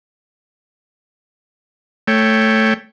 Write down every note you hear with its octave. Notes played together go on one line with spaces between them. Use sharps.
A3 C#5 G5